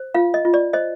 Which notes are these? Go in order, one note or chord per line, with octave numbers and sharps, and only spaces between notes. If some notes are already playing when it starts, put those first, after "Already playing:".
Already playing: C5
F4 F5
D#5
F4
D5
C5 D#5